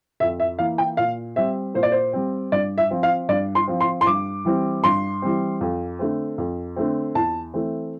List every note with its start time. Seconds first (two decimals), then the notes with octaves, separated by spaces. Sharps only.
0.20 F2 E5
0.40 E5
0.59 E3 A#3 F5
0.78 G5
0.97 A#2 F5
1.36 G3 C4 E5
1.75 A#2 C5
1.83 D5
1.92 C5
2.13 G3 C4
2.52 G2 D5
2.78 E5
2.91 F3 C4
3.03 F5
3.29 G2 D5
3.55 C6
3.68 F3 C4
3.80 C6
4.01 C6
4.06 G2 D6
4.45 E3 G3 C4
4.84 G2 C6
5.22 E3 G3 C4
5.61 F2
5.99 D3 A3 C4
6.38 F2
6.76 D3 A3 C4
7.15 E2 A5
7.54 E3 A3 C4